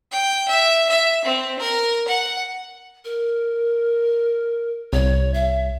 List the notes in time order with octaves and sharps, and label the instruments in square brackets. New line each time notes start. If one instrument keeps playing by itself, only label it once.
[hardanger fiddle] G5
E5
E5
C4
A#4
F#5
[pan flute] A#4
[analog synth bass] C2 [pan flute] C#5
[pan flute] E5